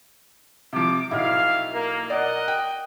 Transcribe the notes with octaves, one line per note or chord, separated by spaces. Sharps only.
C3 F3 D6
B1 E4 E5 F5
A#3
A#4 D5 D#5 F#5
G5